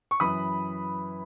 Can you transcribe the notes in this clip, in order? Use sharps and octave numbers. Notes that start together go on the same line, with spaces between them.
C#6
F#2 E3 B5 D#6